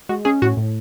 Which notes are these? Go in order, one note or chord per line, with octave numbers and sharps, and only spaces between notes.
G#3 F#4
C#4 G#4
A2 F#4
A2